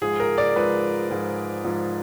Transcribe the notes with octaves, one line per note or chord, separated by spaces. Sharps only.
G#2 F3 G#4
A#4
D5
G#2 F3 B4
G#2 F3
G#2 F3